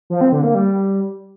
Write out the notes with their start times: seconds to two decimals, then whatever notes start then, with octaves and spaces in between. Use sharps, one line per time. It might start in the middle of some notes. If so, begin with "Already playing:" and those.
0.10 F3
0.21 C4
0.32 D3
0.44 A#3
0.55 G3